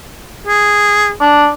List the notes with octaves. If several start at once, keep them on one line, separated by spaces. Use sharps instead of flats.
G#4
D4